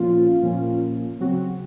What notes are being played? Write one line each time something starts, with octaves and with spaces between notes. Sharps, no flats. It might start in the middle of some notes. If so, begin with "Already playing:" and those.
Already playing: A#2 F3 A#3 C#4 F4
A#2 F3 A#3 C#4
C#3 F#3 C4 F#4